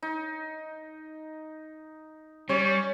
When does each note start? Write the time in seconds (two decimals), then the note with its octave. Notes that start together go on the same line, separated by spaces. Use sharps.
0.02 D#4
2.49 G3 C#4 C#5